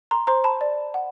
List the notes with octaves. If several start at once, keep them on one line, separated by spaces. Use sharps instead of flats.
A#5 C6
C5 A#5 C6
A5 B5
D5
F#5